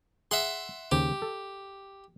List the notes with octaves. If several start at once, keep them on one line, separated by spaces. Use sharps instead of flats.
G#4 E5 F#5 C6
D#2 C#3 G4 C5
A4